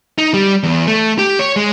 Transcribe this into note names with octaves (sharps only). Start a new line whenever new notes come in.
D#4
G3
E2
A3
G4
C#5
G#3